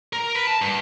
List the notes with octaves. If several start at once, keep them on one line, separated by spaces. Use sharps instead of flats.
A#4
B4
A5
G2